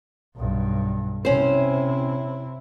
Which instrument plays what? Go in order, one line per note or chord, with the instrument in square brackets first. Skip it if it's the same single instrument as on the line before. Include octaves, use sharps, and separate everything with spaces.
[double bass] B1 G2
[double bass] C3 E4 [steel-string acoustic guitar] C#4 C5